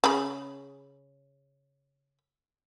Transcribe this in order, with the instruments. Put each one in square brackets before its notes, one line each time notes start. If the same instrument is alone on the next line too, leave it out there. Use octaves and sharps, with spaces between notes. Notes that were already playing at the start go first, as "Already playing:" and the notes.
[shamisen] C#3 B5